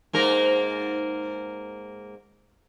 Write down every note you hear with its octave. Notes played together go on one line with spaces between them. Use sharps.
G#2 A#3 A#4